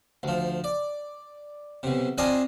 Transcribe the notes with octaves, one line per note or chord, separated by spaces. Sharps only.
D2 F3
D5
B1 C3
C4 D4 F4 D5 D#5 G#5